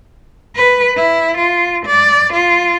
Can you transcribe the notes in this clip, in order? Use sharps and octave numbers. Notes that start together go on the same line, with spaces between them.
B4
E4
F4
D5
F4